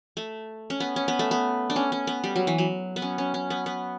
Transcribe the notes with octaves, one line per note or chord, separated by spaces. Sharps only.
A3
C#4
B3
C#4
B3
A3
B3
D4
C#4
C#4
B3
G3
F#3
E3
F#3
B3
C#4
C#4
C#4
B3
B3